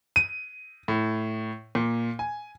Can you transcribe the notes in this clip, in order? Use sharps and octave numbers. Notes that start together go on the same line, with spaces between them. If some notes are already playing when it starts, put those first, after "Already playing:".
D#7
A2
A#2
G#5